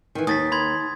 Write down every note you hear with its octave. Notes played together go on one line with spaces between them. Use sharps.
D#3 E3
D#2 D#6 A6 B6
B5 C6 G#6